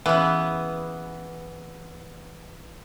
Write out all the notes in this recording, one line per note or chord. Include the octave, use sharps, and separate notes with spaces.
C#3 E3 B3